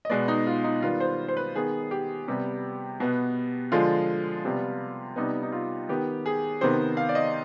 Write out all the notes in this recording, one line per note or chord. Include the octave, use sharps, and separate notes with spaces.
D#5
B2 G#3 B3 D5
D#4
F4
D#4
D#3 G3 B3 F4
C5
C5
B4
D#3 B3 G#4
G4
C3 G3 B3
B2 B3
D3 F3 G#3 F4
C3 G3 B3
C3 G3 B3 D#4
D#4
F4
D#3 B3 G4
G#4
C3 D#3 B3 C5
F5
D5
D#5